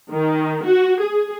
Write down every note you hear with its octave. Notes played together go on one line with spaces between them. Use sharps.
D#3
F#4
G#4